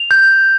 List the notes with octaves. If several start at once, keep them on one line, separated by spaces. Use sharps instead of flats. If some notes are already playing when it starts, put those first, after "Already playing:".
Already playing: F7
G6